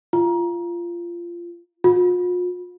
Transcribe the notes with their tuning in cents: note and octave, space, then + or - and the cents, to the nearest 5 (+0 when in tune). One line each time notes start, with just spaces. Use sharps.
F4 -20
F4 +45